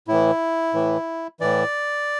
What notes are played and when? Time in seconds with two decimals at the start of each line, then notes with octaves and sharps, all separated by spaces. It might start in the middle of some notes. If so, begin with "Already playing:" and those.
0.08 A2 E3 E4
0.74 A2 E3
1.40 A2 E3 D5